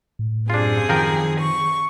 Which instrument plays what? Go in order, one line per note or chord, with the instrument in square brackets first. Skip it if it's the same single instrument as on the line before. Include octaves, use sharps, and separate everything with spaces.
[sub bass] A2
[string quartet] F#2 C3 G#4 [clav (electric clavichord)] D4 F4
[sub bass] D#3 [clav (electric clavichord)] F3 A#4 G5
[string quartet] C#6